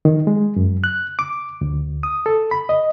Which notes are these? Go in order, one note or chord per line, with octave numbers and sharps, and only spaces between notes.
D#3
G#3
F#2
F#6
D6
D2
D#6
A4
B5
D#5